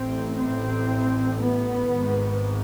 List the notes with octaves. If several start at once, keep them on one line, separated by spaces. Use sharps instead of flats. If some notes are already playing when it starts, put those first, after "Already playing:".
Already playing: A1 A2 C4
C4
B3
G#1 G#2